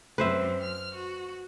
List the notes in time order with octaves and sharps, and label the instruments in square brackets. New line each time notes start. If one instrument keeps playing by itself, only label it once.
[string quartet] F#2 C4 [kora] B4 C5 E5
[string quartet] F6
F#4